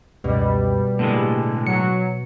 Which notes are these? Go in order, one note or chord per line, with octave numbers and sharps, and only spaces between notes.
C#2 F#2 B2 G3
A2 D3 G#3 A#3
F#3 C#7